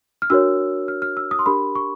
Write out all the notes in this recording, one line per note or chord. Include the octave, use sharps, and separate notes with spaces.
F6
D4 F#4 A#4 C#5 E6
F6
F6
E6
D#6
C6
D4 G4 A#4 B5
C#6